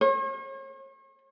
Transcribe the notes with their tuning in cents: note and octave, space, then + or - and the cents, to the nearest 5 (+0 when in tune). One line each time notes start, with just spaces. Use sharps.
C#5 -45